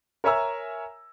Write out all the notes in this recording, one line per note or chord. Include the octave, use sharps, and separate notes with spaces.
A#4 C#5 E5 G#5 A#5 E6